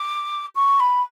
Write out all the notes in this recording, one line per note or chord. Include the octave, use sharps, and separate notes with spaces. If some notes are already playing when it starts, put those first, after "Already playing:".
Already playing: D6
C#6
B5